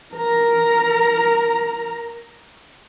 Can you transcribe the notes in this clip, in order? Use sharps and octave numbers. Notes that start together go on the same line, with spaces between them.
A#4 A#5